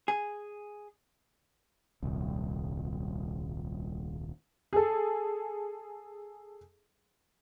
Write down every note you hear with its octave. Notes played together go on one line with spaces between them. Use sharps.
G#4
D#1 C2
G#4 A4